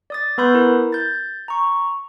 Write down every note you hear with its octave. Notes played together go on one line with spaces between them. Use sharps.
D5 D#6 A6
B3 B4 B5 C6 D#6 G6
E4 A#4
G6 A6
A#5 C#6